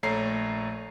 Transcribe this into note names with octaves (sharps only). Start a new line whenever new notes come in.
A#1 A3 C#5 A#5 C7